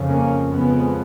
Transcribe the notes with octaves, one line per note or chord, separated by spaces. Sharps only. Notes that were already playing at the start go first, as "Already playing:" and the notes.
Already playing: F2 C#3
A#3 C#4
F2 C#3 G#3 B3